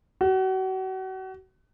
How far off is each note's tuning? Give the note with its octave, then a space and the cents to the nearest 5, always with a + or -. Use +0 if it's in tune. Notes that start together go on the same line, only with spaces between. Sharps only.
F#4 +35